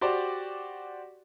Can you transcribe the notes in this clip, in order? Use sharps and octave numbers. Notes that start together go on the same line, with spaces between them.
F#4 G4 C5 D5